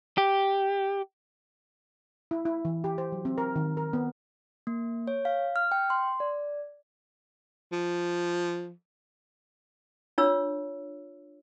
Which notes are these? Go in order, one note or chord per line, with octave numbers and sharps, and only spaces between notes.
G4
E4
E4
E3
G4
C5
F#3
C4
A#4
D#3
A#4
B3
A#3
C#5
F5
F6
G5
C6
D5
F3
D4 F4 C#5 E6